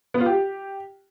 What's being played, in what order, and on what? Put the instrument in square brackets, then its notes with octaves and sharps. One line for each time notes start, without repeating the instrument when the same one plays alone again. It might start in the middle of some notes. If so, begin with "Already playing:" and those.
[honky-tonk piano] B3
F4
G4